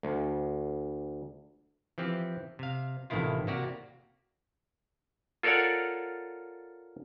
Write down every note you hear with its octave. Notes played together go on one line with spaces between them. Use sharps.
D2
E3 F3 C4 G4
C3 F5
A1 A2 C3 D#3 E4 F4
C3 A#3 F#4 G4 D5
F4 A4 A#4 C#5 D5 F#5